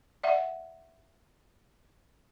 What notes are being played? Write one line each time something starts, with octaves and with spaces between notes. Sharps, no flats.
D5 E5 F#5